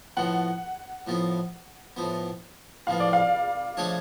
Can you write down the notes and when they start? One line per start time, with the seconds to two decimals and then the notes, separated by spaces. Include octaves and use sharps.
0.17 A2 F3 B3 F#5
1.07 A2 F3 B3
1.97 A2 F3 B3
2.87 A2 F3 B3 F5
3.00 D5
3.13 F5
3.77 F3 A3 D4 G#4 C#5